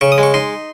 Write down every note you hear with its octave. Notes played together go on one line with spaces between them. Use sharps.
C#3 C#6
D#6
G#3
C#6
D#4 C6